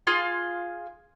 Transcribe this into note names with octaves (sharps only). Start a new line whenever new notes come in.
F4 G#4 F5 C6